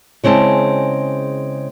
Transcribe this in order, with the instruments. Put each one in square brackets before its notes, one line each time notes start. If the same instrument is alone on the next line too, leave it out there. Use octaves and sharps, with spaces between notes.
[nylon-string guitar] C#3 G#3 C4 E4 A5